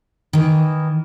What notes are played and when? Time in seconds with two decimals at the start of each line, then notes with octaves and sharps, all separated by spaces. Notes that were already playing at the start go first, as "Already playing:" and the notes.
0.33 D#3 E3